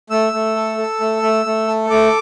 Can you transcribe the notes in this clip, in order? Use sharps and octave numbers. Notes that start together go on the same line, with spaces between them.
A3 E6
A3
A4
A4
A3
A3
A3
A4
A3 D6